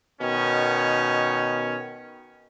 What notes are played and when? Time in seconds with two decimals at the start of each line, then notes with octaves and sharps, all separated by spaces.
0.21 B2 D#3 C#4